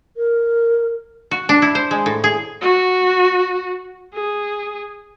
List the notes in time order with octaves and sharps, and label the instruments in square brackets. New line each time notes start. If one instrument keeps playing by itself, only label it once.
[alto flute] A#4
[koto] F#4
D4
E4
C5
G#3
A2
G#4
[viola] F#4
G#4